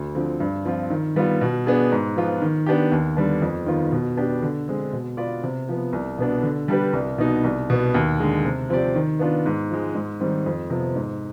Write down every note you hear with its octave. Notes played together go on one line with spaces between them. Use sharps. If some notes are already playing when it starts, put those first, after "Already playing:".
Already playing: D2
D3 F3 C4
G2
F3 C4 F4
D#3
G3 B3 F4
B2
B3 D4 G#4
G#2
F3 B3 F4
D#3
B3 D4 G4
D#2
D3 G3 B3 D4
F2
D#3 B3 F4
B2
B3 D4 G4
D3
G#3 C4
B2
B3 F4 B4 D5
C3
F3 B3
C2
B2 B3 D4
D3
G3 D4 G4 B4
C2
B2 B3 D#4
C2
B2 B3
D#2
D3 G#3
C3
F3 C4 G4 D5
D#3
B3 D4 F4
G#2
F3 G#3
G#2
D#3 G3 C4
F2
C3 F3 B3
G#2